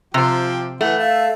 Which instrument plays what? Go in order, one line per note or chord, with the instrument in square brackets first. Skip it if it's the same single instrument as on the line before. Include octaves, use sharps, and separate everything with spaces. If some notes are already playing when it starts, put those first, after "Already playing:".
[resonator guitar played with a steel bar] C3 C5 [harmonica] F3 G4 G5
[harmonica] E3 F#5 [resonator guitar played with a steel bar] A3
[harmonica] E5 A5 [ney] F5